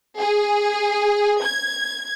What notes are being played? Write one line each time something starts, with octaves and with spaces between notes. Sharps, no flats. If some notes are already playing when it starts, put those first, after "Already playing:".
G#4
G#6